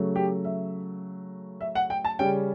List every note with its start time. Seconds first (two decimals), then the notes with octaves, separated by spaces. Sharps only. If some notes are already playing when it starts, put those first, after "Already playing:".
Already playing: C#3 F#3 A3
0.16 G4
0.44 E5
1.61 E5
1.75 F#5
1.90 G5
2.05 A5
2.19 C#3 G3 C#4 G5